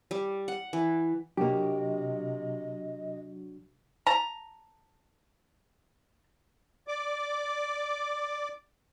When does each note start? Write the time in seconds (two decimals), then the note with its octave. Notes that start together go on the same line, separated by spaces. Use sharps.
0.11 G3
0.48 F#5
0.73 E3
1.37 C3 F#3 A#3 D4 F#4 G4 D#5
4.07 A5 A#5
6.88 D5 D6